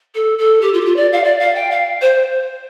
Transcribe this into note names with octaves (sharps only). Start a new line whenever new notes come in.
A4
A4
G4
F4
G4
F4
D5
F5
D5
F5
G5
F5
C5